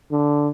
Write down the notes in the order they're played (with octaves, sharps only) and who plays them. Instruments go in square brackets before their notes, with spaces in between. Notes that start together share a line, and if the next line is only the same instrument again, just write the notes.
[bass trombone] D3